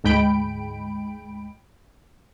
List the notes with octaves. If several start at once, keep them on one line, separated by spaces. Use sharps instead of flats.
D2 G#2 G#3 G5 B5 D7